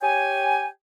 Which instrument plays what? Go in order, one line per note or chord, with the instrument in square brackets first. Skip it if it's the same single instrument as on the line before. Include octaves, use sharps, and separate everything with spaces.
[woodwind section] G4 C#5 G5 G#5